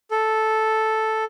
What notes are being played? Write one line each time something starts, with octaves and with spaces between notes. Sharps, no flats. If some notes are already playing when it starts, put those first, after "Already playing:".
A4